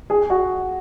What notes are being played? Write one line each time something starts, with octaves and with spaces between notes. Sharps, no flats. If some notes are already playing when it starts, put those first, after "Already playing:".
G#4
F#4